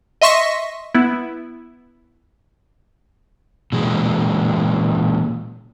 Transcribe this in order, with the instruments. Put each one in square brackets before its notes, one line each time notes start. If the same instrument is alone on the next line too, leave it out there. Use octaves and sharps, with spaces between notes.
[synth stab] D#5 E5 C6 C#6 A#6 B6
B3 E4
[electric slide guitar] A#2 E3 G#3